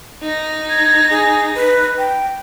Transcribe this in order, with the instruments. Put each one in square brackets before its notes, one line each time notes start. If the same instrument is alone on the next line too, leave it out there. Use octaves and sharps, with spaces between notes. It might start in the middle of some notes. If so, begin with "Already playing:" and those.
[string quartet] D#4 A#6
[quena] G#6
G#4
B4
G5